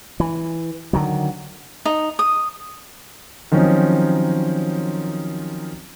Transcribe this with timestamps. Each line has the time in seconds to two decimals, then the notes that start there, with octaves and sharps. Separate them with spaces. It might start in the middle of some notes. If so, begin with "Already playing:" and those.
0.20 E3
0.93 D3 D#3 F#3
1.85 D#4
2.19 D#6
3.52 D#3 F3 F#3 C4 C#4 D#4